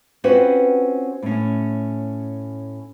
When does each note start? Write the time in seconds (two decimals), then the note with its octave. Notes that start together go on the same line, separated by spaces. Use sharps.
0.24 C4 C#4 F4 F#4 B4 C5
1.22 A2 C#4